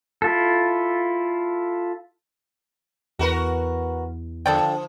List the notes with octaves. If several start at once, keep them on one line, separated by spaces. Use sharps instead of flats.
E4 F4 A4
E2 F#4 A#4 B4
D3 F3 A4 D5 G5